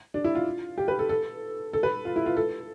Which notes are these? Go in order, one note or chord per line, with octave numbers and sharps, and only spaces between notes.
D4
E4
F4
G4
B4
A4
A4
A4
B4
F4
E4
F4
A4